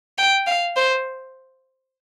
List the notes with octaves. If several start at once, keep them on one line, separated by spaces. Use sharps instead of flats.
G5
F5
C5